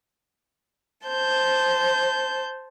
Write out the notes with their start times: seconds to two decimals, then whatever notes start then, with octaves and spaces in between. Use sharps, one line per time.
1.07 C5 A5 G6